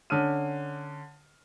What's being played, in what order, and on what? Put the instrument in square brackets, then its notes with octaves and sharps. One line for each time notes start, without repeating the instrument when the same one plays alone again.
[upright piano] D3 C#4 F6 D#7